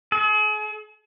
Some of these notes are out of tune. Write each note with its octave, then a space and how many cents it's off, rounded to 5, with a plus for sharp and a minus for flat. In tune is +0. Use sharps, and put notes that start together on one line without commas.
G#4 +40